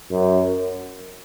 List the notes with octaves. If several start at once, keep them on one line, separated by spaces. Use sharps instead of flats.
F#2